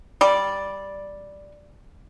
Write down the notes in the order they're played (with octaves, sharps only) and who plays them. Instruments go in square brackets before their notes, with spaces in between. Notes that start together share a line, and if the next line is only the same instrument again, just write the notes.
[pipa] G3 D5